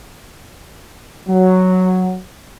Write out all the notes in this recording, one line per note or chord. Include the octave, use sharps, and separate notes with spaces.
F#3